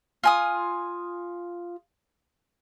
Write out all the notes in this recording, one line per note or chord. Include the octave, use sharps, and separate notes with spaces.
F4 G#5 D#6